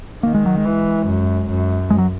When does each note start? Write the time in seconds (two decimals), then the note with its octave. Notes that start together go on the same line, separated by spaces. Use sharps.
0.23 D#3 A#3
0.35 G#3
0.46 F#3
0.57 G#3
0.65 E3
1.07 F#2
1.49 F#2
1.90 G#3
1.98 F#3